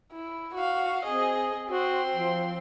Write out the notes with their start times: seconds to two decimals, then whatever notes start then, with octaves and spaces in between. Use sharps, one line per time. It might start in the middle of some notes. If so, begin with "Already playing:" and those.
0.12 E4
0.55 F#4 F5
1.05 C4 G#4 D#5
1.70 C4 F#4 C6
2.14 F3